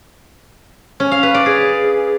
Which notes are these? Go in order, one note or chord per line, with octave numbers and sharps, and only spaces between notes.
C#4
F5
B4
D5
G#4